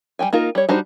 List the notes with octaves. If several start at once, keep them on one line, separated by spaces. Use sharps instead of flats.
G3 C#4 G5 G#5
A#3 D#4 F4 A#4
G3 C#5
G3 D4 D#4 F#4 C5